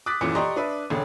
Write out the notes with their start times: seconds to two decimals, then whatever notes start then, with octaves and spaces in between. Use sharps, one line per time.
0.06 D6 D#6 F#6 A6 B6
0.21 D#1 F#2 A#2 E3 D6 C#7
0.35 G4 D5 D#5 A#5 C6 C#6
0.56 D4 B4 E5
0.90 E1 A1 D3